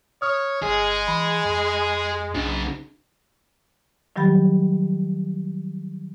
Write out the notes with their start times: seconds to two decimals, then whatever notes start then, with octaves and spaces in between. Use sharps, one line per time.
0.22 C#5 D#6 F6
0.62 G1 G#3 G#4
1.08 E3 B5
1.45 F2
2.34 B1 C#3 D4 F#4
4.16 D#3 F#3 G3 G4 B5